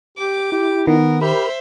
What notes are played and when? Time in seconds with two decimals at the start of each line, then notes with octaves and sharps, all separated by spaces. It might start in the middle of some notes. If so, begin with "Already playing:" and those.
0.18 G4 D6
0.52 E4 G4
0.87 D#3 B3 A#4
1.21 G4 A#4 C5 E5 B5 F6